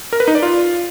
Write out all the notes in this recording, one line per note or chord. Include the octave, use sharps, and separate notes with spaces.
A#4
B4
D#4
D5
F4